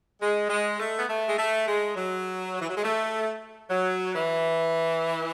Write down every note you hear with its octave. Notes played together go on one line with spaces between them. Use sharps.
G#3
G#3
A3
B3
A3
G#3
A3
G#3
F#3
E3
F#3
G#3
A3
F#3
E3